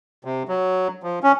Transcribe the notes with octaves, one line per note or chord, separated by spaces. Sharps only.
C3
F#3
F3
C#4